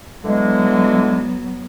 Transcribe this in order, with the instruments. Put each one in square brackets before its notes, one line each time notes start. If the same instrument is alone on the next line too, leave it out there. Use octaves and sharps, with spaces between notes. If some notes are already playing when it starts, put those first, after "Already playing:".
[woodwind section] D3 E3 G#3 [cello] F#3 B3